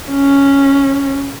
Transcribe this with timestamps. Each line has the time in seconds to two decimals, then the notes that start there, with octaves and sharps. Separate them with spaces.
0.10 C#4